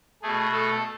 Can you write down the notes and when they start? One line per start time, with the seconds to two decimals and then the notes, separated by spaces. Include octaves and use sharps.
0.23 B2 A3 G#4
0.52 A3 A4